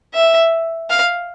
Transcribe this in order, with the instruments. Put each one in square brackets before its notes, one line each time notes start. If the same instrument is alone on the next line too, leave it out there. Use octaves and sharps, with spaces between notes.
[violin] E5
F5